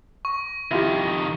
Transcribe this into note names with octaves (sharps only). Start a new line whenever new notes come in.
C#6
F2 D#3 E4 F4 G4